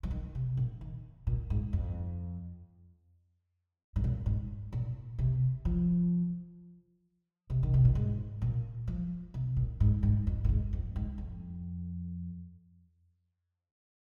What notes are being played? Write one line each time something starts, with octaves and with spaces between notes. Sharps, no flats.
F3
D#3
C3
A#2
D#3
A#2
G#2
F2
G#2
A#2
G#2
A#2
C3
F3
C3
D#3
C3
A#2
G#2
A#2
F3
C3
A#2
G#2
G#2
F2
A#2
G#2
F2
G#2
F2